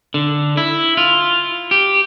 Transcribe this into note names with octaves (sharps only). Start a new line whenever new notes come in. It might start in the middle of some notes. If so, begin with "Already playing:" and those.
D3
E4
F4
G4